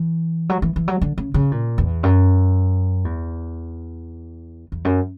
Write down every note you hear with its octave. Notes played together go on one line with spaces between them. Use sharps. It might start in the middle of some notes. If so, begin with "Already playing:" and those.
Already playing: E3
F#3
E3
E3
F#3
D3
C#3
C#3
A#2
E2
F#2
E2
E2
F#2